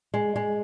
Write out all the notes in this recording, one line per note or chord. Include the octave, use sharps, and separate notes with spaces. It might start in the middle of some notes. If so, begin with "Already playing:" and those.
G#3
G#3